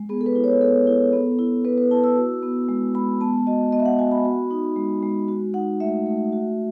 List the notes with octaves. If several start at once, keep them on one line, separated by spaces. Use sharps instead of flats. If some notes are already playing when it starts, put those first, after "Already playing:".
Already playing: G#3
B3 G#4
A4
B4
E4
C#5
B3 A4
E4
B3
E4
B3 B4
B4
E4 A5
E6
F#4
B3
G#3
G#3 B5
B3 A5
F#4 D#5
B3 D#5
E5
F#5
F#4 G#5
B5
F#4
D#4
G#3
G#3
F#4
D#4 F#5
A3 E5
A3
F#4